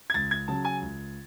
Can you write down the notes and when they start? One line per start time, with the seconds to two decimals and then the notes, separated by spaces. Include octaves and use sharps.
0.10 G#6
0.14 C#2 A6
0.31 G#6
0.48 C#3 F#3 A5
0.65 G#5
0.81 C#2